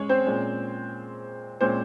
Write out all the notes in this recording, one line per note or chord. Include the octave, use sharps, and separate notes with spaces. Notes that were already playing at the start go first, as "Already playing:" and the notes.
Already playing: G#3 C#4 G#4 C#5
C4 C5
A#2 G#3 C#4
A#2 G#3 C4 C#4 C5